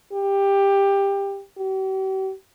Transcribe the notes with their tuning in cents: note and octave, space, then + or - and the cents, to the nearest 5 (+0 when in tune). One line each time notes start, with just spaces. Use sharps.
G4 +15
G4 -45